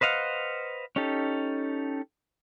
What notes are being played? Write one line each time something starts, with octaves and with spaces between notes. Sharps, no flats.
B4 C5 D#5 F5 F#5
C#4 D#4 G4 A4